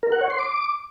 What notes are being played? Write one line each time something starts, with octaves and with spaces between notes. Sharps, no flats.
A#4
F#5
C#5
C6
D6